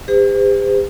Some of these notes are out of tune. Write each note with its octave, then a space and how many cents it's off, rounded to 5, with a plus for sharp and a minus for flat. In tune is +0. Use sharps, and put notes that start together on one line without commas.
G4 +45 C5 -45